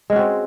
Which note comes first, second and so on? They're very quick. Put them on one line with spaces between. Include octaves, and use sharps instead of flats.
G#3 C#4 F#4 C4